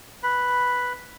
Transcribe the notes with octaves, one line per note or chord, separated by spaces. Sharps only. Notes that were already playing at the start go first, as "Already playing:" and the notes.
B4 B5